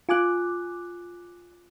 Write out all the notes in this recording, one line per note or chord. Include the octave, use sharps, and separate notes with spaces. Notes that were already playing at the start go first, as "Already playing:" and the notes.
F4 G#5 D6 F#6